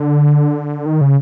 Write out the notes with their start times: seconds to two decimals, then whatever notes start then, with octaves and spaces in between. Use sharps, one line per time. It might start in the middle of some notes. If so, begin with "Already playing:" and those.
Already playing: D3
0.86 D#3
1.01 C#3